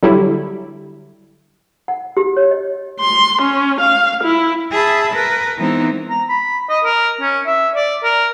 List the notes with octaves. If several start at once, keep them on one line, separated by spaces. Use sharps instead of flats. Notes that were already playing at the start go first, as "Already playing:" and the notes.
D3 F#3 G3 E4
F#5
G4
C#5
D#5
C6
C#4
F5
E4
G#4 E5 A5 B5
A#4 B4
E3 G#3 B3 C4 D#4
A#5
B5
D#5
A#4
C#4
E5
D5
A#4